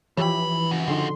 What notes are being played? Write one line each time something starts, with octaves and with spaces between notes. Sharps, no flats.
G2 E3 F3 G4 C#5 B5
C#3 F#4
D3 F3 D#4 C6